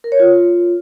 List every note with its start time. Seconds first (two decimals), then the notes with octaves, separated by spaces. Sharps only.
0.04 A#4
0.12 C#5
0.20 F4